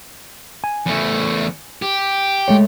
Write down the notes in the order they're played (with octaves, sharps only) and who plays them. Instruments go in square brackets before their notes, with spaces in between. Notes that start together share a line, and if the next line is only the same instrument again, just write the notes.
[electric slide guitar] G#5
[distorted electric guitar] E2 A3
G4
[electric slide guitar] G#3 A3 C#5